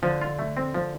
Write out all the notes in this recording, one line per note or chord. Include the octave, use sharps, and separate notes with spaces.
D3 F3
F4
A3
C4
F3